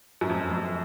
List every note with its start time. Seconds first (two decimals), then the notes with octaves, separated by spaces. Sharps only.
0.21 F#2
0.30 F2
0.51 F2